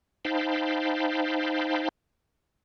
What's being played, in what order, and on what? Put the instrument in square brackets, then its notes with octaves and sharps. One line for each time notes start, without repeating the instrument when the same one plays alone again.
[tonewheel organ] D#4 C5 F5 G5 A5 B5